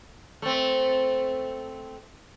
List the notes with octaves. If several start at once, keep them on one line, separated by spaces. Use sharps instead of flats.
A3 C4